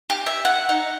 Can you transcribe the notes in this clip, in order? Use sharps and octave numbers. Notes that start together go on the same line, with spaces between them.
G4
E5
F#5
D#4